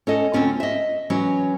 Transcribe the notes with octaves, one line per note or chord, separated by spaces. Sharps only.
C#4 A4 D#5
D2 C4 C#4 F4
D#5 E5
E3 F#3 C#4